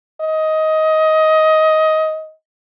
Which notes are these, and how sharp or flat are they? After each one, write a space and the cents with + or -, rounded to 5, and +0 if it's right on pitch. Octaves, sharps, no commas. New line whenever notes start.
D#5 +15